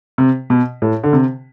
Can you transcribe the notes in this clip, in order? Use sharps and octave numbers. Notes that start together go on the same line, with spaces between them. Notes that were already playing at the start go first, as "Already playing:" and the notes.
C3
B2
A2
D3
C3